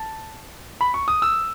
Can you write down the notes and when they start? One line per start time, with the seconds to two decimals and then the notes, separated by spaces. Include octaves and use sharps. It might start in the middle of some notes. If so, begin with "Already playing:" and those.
Already playing: A5
0.81 B5
0.94 C#6
1.08 D#6
1.22 E6